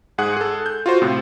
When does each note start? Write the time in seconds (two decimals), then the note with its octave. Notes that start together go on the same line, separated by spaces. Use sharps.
0.18 G#2 G#4 F#5 F#6
0.37 G#4 A4
0.66 G6
0.86 F4 F#4 C5
1.02 A2 C3